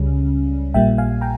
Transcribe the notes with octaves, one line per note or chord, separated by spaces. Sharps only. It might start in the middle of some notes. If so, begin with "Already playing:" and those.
Already playing: C#2 C#3 G3 C#4
A#1 A#2 G3 A#3 E5 G5
F5 G#5
G5 A#5